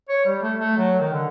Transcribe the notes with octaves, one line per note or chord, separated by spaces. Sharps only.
C#5
G3
A3
A3
F#3
D#3
D3